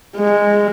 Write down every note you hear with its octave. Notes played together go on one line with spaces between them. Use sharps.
G#3